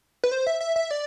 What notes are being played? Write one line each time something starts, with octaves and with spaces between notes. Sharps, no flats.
B4
C5
E5
E5
E5
D5